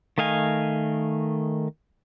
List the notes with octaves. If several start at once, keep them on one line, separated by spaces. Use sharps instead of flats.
D#3 A3 D#5 F5 G#5